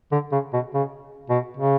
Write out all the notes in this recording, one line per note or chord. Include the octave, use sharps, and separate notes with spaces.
D3
C#3
B2
C#3
B2
C#3